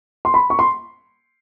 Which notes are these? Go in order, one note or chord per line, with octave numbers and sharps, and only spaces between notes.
C6
B5
C#6
C6